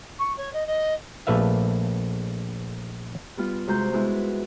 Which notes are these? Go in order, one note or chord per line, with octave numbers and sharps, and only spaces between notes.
C#6
C#5
D#5
D#5
A#1 A3 B4 E5 F5
G3 B3 F4
C3 G#3 F#4 C5 A#5 G6
G#3 B3 E4 F#5
B4